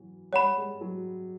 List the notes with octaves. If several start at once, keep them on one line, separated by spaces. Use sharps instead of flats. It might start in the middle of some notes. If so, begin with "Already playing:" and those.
Already playing: E3 F#3
G3 C#5 F#5 B5
G#3
F#3